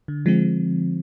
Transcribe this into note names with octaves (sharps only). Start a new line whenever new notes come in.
D3
F3 G#3 C4